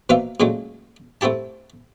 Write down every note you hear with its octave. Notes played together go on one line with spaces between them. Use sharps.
B2 F3 A#3 F4 E5 F5
A#2 C#3 F#3 G#3 A3
A3 C4 E4 G4 A5